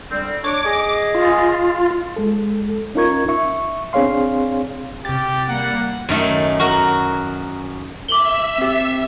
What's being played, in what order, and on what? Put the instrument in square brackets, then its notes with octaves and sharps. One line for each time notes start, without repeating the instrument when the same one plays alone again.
[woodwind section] D3 G3 C4
[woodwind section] D4 C#5 [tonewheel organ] D6
[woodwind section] G#4 D#5
[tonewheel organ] F4
[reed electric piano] G#3 A4
C#4 D#4 F4 A#4 C#6 G#6
E5 C#6
C4 D4 G#4 C#5 F5 C6
[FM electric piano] C3 A6 [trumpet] G4
[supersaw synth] G3 A#3 [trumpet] F#5
[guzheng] F#2 D#3 A3
F#4 A#4
[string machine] E5 [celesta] D6 F#7 G7
[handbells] C4 G4